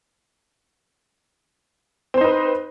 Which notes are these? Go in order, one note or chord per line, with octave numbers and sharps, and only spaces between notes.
C4 D#4 B4 C5